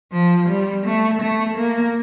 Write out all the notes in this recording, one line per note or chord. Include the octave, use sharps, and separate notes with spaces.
F3
G3
A3
A3
A#3